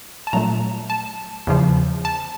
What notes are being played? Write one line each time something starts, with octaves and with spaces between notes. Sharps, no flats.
A5
A#2 F#3 A3 A#5
A5
E2 C#3 F3
A5